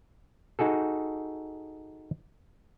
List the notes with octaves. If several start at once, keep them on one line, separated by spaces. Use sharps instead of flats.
D#4 F#4 G#4 A4